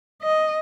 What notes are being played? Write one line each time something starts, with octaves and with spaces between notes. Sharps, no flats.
D#5